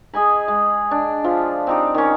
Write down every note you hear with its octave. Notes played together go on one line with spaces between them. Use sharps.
G#4 D#5 G#5 B5
G#3
D4
F3 F4 E5
C4 D#4 G4
D#3 C#4